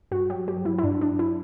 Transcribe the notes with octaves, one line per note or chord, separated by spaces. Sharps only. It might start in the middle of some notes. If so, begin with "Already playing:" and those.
G2 F#4
F#3 G4
F#3 G4
F#3 E4
E4
G2 D4
F#3 D4
E4